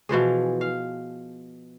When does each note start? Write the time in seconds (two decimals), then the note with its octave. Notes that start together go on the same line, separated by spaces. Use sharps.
0.09 B2 E3 F3 G#4
0.61 F5